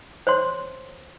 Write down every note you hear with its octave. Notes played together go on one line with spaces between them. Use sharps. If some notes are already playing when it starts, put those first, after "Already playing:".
C5 C#5 C6